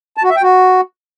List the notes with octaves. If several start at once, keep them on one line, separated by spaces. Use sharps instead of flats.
A5
F#4
E5
G5
F#4